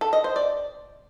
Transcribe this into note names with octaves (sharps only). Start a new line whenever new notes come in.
A4
D#5
C5
D5